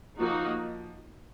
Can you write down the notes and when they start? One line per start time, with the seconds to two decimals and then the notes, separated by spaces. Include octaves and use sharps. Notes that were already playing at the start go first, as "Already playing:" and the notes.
0.20 F3 A#3 D#4 F#4